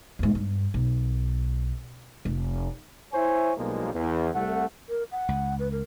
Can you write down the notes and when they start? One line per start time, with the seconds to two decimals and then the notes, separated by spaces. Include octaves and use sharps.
0.19 E2 G#2
0.35 G2
0.74 B1
2.25 F1
3.13 E4 C5 C#5 E5 G#5
3.57 B1 B2 F3 G3 G#3 A#3
3.94 E2
4.34 C2 A3 F#5
4.89 A#4
5.11 F#5
5.29 C#2
5.59 B4
5.72 A#4